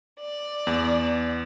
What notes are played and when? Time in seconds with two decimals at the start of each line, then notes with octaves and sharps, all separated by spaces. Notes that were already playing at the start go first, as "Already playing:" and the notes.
0.19 D5
0.67 E2